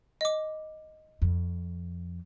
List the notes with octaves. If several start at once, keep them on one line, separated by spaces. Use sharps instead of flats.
D#5 D6
F2